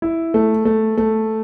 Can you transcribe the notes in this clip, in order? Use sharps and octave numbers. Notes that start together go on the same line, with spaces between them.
E4
A3
A3
A3